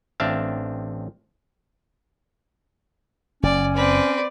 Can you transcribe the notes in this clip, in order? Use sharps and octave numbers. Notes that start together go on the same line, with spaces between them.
A1 C4 D4 E5 F5 A5
F#1 C#4 D5
C4 B4 D5